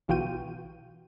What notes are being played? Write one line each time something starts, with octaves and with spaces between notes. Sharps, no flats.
B1 E3 F4 F#4 G5 D#7